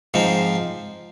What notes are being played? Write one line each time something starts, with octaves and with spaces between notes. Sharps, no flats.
G#2 F3 C4